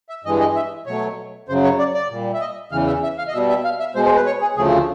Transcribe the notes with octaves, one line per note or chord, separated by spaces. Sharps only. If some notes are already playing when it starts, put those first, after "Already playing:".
E5
G2 E3 G#3 D#5
D#5
E5
B2 F#3 A3 C#5
F#2 C#3 F#3 C5
C#5
D5
D5
A#2 G3
E5
D#5
E2 C#3 E3 F5
E5
E5
F5
D#5
B2 G3 E5
E5
F5
E5
B2 G#3 C5
C5
B4
C#5
G#4
D2 C#3 F3 A3 G#4